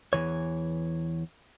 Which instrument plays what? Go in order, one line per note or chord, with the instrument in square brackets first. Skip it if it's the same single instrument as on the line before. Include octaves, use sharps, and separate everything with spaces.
[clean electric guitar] E2 C#3 E3 C#5